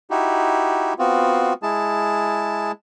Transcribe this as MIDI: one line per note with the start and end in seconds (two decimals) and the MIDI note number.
0.10 0.94 63
0.10 0.94 64
0.10 0.94 66
0.10 0.94 67
0.99 1.53 59
0.99 1.53 60
0.99 1.53 65
0.99 1.53 66
1.63 2.72 56
1.63 2.72 64
1.63 2.72 68
1.63 2.72 81